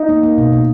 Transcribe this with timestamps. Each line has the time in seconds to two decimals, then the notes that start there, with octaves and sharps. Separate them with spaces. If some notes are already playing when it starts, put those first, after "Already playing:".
Already playing: D#4
0.09 A#3
0.23 A#3
0.38 B2
0.53 B2